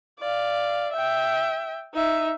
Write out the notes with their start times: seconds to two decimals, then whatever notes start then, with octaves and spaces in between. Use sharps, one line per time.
0.20 D5 F5
0.93 E5 G5
1.94 D#4 E5